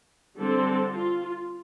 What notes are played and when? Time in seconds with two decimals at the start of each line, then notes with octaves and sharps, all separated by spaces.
0.38 D3 G3 C4 A4
0.91 F4